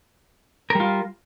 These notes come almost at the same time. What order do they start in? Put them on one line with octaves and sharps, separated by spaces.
A#4 G3 F4